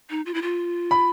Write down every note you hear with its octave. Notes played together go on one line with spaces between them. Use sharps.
D#4
F4
E4
F4
B5